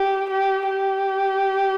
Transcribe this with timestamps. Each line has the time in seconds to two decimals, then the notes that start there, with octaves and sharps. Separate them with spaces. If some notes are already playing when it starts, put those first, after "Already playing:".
Already playing: G4
0.30 G4
0.70 G4